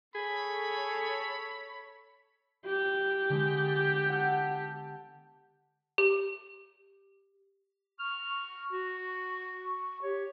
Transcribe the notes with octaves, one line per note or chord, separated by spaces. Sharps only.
G#4 A4 C#5 B5
G4
D3 G#3 B3
A6
F#5 A5 E6
G4
C#6 F6
F#4 C#6
G4 C#5